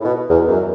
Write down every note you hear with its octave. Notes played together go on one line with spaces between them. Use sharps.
A2
B2
E2
F#2